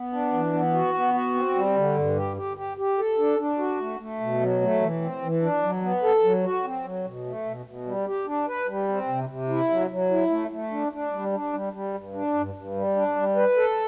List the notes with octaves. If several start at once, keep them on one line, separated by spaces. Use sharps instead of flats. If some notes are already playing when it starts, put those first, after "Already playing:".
Already playing: B3
D4
E3
B3
F#4
B3
F#4
C4
G3
D3
G2
G4
G4
G4
G4
A4
D4
D4
F#4
A3
A3
B2
F#3
A3
E3
C4
E3
D4
F#3
B3
A4
F#3
F#4
C4
F#3
B2
A3
B2
B2
G3
G4
D4
B4
G3
C4
C3
C3
E4
F#3
F#3
E4
A3
A3
D4
D4
G3
D4
G3
G3
G2
D4
G2
G2
G3
D4
G3
B4
A4